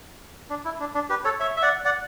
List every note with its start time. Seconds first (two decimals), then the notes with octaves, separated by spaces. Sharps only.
0.50 D4
0.65 E4
0.80 D4
0.94 D4
1.10 G4 B4
1.24 A4 C#5
1.40 C#5 E5
1.57 E5
1.62 D5 F#5
1.85 D5 F#5